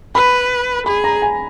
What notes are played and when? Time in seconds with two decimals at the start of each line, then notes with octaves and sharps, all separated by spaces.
0.15 B4 B5
0.86 G#4 B5
1.04 A#5
1.22 G#5